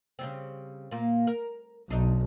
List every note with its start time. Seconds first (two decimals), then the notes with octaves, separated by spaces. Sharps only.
0.19 C#3 G3 C4
0.91 A#2 A#3
1.27 A#4
1.90 B1 D4 D#4